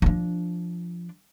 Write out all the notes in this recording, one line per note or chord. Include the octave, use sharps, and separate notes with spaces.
F3 D4